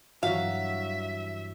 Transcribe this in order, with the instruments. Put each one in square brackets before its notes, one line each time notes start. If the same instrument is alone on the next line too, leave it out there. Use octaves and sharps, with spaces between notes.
[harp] G2 E3 [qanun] F#3 F#4 [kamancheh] E5 [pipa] F5